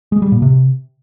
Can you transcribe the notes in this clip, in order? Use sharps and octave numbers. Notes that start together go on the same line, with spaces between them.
G#3
G3
A#2
C3